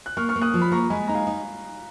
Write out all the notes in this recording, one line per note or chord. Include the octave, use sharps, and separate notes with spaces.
F#6
A#3 C#6 F6
C#6 F6
A#3
D#6 F#6
F3
B5
A#3 A#5 C#6
G#3 G#5 B5
D#4 A#5
F5 G#5
D#4